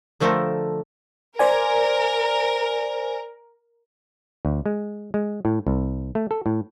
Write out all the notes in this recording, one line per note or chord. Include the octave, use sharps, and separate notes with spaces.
D3 F3 A3 C4 A4 A#4
A#4 C5 D5 G#5
D2
G#3
G#3
A2
C2
A3
A4
A2